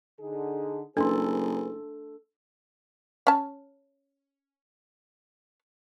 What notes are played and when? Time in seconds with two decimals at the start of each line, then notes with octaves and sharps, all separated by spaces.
0.20 D3 D#4 G#4
0.97 F#1 D4 G#4 A4 B4 C6
3.27 C#4 A5